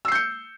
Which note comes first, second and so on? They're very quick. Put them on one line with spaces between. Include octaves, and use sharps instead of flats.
E6 C7 G6 C#7